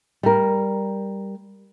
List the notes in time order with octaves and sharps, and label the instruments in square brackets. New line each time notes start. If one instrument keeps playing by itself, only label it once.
[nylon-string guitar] G3 A#4